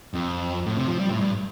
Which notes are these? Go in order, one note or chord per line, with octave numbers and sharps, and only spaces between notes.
F2
A2
C3
F3
G3
A2
G2